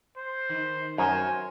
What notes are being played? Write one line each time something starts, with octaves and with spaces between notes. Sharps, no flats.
C5
D#3
F#2 A#4 C5 C#5 G#5